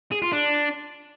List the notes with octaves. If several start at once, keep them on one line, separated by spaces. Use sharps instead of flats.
G#4
F4
D4